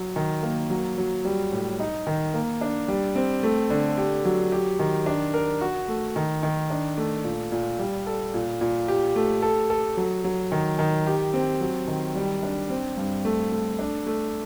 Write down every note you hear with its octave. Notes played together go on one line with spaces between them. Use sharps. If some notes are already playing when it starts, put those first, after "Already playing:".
Already playing: F#3
D#3
A#3
F#3
F#3
G3
A2
D#4
D#3
A#3
D4
G3
C4
A3
D3
G4
F#3
G4
D#3
D4
A#4
F#4
A3
D#3
D#3
D4
A3
A#2
A#2
G3
A4
A#2
A#2
G4
A3
A4
A4
F#3
F#3
D#3
D#3
G4
C4
F#3
D#3
G3
D4
C4
G2
A3
A3
D4
A3